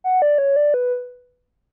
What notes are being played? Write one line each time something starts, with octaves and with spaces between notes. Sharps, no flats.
F#5
D5
C#5
D5
B4